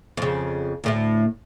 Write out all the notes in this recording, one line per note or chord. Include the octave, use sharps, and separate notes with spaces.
F2 C#3
D2 A2 A3